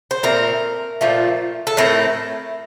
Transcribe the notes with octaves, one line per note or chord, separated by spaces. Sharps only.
C5
A#2 A3 C4 A#4
A#2 F3 A3
A4
A2 A3 C4 A#4